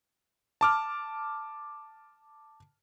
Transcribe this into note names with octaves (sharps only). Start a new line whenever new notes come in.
A5 D6 F6